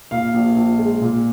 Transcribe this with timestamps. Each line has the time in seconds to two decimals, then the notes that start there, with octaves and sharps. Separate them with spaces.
0.11 A#2 F5
0.34 A#1
0.56 A#1
0.79 G#3
1.01 A#2